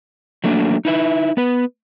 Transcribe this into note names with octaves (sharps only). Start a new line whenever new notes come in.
F#3 A3 A#3 D4
D#4 E4 B4 E5
B3 B4